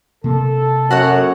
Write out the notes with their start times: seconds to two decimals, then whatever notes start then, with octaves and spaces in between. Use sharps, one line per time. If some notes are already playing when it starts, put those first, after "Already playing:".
0.24 C3 A#3 A4
0.91 F#2 F#4 C#5 F#5